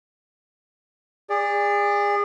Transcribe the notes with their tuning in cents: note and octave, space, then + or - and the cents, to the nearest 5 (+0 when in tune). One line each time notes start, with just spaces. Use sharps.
G#4 -30 D5 +0